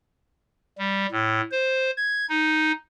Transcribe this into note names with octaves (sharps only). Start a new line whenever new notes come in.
G3
A2
C5
G#6
D#4